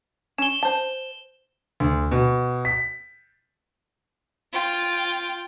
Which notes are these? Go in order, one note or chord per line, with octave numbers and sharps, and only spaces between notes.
C#4 E7 G7
C5 A5
D2
B2
B6
F4 G5